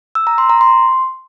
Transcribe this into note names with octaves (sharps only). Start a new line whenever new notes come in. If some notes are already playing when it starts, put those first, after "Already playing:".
E6
A#5
C6
A#5
C6